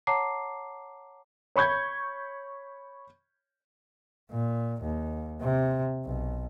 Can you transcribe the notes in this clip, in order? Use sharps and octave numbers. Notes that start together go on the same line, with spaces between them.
C#5 F#5 A5 A#5 D6 C7
C#5 B5 C#6 G6 G#6
A#2
D#2
C3
B1